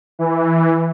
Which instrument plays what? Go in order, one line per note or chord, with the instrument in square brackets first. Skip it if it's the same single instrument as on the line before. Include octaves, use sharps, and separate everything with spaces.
[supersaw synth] E3